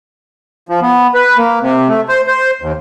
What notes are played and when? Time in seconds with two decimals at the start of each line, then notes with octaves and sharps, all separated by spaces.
0.69 F3
0.82 B3
1.15 B4
1.38 A#3
1.62 C3
1.89 A3
2.09 C5
2.27 C5
2.62 D#2